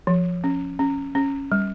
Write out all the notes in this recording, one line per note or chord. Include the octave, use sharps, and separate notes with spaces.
F3
C#4
C#4
C#4
G3